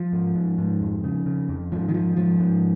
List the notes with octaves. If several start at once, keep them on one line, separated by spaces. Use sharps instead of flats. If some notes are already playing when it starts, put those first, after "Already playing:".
Already playing: F3
G#2
G#2
G#2
F2
C#3
C#3
F2
G#2 F3
D#3
G#2 F3
G#2 F3
G#2